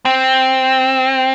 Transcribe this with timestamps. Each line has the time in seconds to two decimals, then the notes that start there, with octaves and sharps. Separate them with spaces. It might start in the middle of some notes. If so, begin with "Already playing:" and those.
0.05 C4